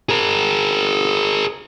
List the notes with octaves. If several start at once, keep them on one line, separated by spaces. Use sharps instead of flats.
G#4 A#4